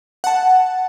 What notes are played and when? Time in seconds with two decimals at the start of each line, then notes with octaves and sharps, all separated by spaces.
0.24 F#5 A5